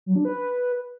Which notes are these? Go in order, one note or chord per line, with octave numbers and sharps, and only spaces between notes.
F#3
D4
B4